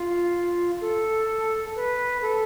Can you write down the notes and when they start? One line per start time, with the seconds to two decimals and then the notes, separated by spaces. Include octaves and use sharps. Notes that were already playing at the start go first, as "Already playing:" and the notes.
Already playing: F4
0.81 A4
1.75 B4
2.22 A4